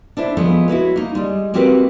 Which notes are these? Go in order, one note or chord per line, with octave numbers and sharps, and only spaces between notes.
D4 E4 C5 E5
F3 G#3 A3 B3
E4 F#4 B4 C#5
A#3 D#4
G3 G#3
A#3 C4 F#4 G4 A#4 B4